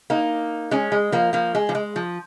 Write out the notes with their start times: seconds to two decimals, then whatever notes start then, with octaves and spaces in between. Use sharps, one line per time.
0.10 A#3 D#4
0.71 G#3 C#4
0.92 G#3
1.12 F3 A#3
1.33 F3 A#3
1.55 G#3
1.69 F3
1.75 G#3
1.96 F3